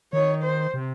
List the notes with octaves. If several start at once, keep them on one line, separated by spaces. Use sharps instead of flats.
D#3 C#5
C5
C3